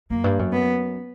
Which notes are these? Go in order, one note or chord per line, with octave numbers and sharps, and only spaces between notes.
F#2 A#3
G2
F#2
B3